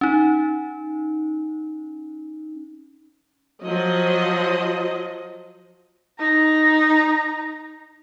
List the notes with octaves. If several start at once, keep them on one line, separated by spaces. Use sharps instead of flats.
C#4 D#4
F3 F#3 D#5
D#4 A#5